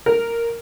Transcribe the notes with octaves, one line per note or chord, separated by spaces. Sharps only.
A#4